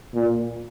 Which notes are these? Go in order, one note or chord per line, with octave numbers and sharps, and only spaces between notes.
A#2